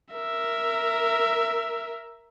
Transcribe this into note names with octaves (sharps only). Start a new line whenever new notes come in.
A#4 E5